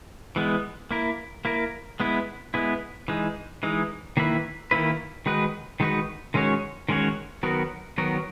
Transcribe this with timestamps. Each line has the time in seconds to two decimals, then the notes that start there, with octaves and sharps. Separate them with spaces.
0.36 E3 G#3 B3
0.91 A#3 E4 A#4
1.45 A#3 E4 A#4
2.00 G#3 B3 E4
2.54 G#3 B3 E4
3.08 E3 G#3 D#4
3.63 E3 G#3 D#4
4.17 D#3 A#3 E4 B4
4.71 D#3 A#3 E4 B4
5.26 D#3 G#3 D#4 F#4 B4
5.80 D#3 G#3 D#4 F#4 B4
6.34 D#3 G#3 C#4 F#4 C#5
6.89 D#3 G#3 C#4 F#4 C#5
7.43 D#3 F#3 B3 F#4 A#4
7.98 D#3 F#3 B3 F#4 A#4